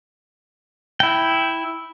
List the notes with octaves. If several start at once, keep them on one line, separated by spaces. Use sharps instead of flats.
E4 G5